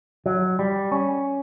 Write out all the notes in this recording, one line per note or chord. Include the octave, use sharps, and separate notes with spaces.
F#3
G3
C#4